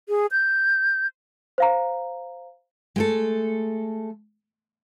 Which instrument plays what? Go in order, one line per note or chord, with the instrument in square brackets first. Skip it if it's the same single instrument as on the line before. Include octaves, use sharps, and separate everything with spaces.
[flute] G#4
G6
[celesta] C5 F5 A#5
[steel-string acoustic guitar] G#3 A3 A4